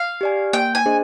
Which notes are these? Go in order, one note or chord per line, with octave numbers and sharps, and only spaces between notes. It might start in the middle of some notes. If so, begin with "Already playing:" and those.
Already playing: F5
G4 D5 G#5
A#3 G5
G#5
D4 G#4 C5 D#5